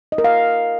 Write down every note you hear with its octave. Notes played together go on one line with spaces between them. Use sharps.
D#5
A#4
F5